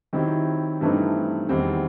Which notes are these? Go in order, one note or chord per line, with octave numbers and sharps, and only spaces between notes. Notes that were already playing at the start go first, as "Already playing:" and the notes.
D#3 F#3 C4 E4 G4
G2 E3 A3 C4 D#4
E2 D#3 G3 C4